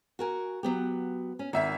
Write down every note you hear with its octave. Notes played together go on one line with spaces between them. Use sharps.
F#4 A#4 G#5
F#3 B3 G4
C#4
G#1 D#3 E5 B6